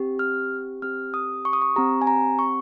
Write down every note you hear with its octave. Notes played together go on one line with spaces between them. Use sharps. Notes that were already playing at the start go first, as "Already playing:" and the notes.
Already playing: C4 G4
F6
C4 G4 F6
D#6
C#6
D#6
C#6
C4 G4 A#5
G#5
A#5
C#6